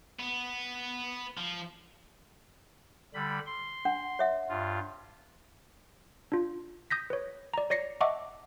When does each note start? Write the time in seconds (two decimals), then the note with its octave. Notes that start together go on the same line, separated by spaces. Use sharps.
0.19 B3
1.37 F3
3.14 D3 G3 B5
3.46 C6
3.85 D4 F#5
4.19 C#5 E5 F#5
4.49 G2 F4
6.32 D4 F4
6.90 D#6 G6 A#6 B6
7.10 B4 C#5
7.54 D5 A#5
7.70 C#5 D5 A#6 C7 C#7
8.01 D#5 E5 F#5 A5 C#6 D6